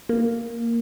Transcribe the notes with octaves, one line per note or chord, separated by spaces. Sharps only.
A#3